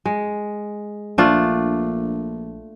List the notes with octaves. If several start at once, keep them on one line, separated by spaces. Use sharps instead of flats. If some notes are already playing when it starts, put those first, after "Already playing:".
G#3
A#1 A3 D4 F4